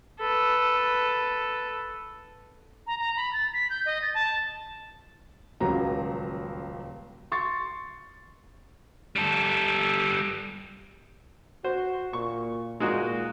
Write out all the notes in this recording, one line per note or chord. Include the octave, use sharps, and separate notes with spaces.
A4 B4
A#5
A#5
B5
A6
B6
G6
D#5
A6
A5
D#1 C#2 F#3 A#5
C6 C#6 A6
G3 A4
F#4 C5
A#2 C#6
A#2 G#3 D#4 F#4